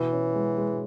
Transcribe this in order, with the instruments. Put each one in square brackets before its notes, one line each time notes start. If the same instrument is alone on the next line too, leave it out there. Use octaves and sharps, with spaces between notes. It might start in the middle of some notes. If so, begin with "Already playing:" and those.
Already playing: [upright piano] B2 [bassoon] E3
[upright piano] C#4
G#3
G#3